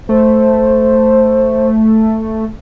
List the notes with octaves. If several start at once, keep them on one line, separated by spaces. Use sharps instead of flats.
A3 C5